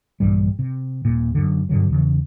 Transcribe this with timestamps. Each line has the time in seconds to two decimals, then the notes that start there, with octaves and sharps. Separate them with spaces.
0.20 A#1 G2 E3 G3
0.59 C3
1.05 D#1 A#2
1.35 F#2 D3
1.69 G2 B2 D3 F#3
1.90 E2 C#3 E3